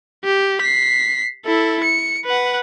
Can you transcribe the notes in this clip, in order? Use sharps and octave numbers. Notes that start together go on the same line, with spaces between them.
G4
B6 C7
E4 A4
C#7
B4 F#5